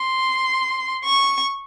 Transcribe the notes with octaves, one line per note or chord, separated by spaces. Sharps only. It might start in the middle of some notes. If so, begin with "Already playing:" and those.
Already playing: C6
C#6